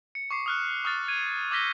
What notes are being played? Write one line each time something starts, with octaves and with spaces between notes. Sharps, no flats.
C#7
C#6 D6 C7
D#6 F6 F#6
C#6 D#6 F6 F#6 A6
G#6 D#7
D6 E6 G6 A#6 B6 G7